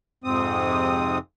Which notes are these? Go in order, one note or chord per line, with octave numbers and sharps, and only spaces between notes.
F2 G#2 C3 C4 D#6